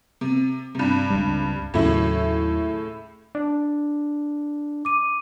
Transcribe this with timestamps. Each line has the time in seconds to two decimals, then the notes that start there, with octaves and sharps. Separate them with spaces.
0.21 C3
0.75 G2 C3
1.10 C#2 G3
1.74 D#2 A2 C#3 F#3 E4
3.35 D4
4.85 D6 D#7